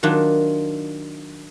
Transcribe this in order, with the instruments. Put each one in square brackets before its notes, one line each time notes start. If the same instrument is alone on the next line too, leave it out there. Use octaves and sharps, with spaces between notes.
[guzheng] D#3 F#3 D4 F4